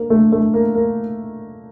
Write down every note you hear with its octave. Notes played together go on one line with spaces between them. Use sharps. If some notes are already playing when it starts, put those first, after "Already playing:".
Already playing: A#3
A3
A3
A#3
A#3